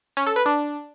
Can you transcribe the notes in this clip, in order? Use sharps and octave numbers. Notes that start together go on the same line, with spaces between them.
C#4
A4
B4
D4